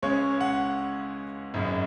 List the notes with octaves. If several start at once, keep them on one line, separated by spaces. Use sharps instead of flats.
C#2 C#3 G#3 C#4 C#5
F#5
G#1 F#2 C#3